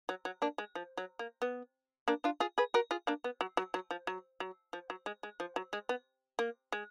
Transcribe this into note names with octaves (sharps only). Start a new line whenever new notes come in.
F#3
F#3
A#3 D4
G#3
F3
F#3
A#3
B3
A#3 D4
D4 F4
F4 G#4
G#4 B4
F#4 A#4
F4 G#4
A#3 D4
B3
F#3
F#3
F#3
F3
F#3
F#3
F3
F#3
G#3
G#3
F3
F#3
G#3
B3
A#3
G#3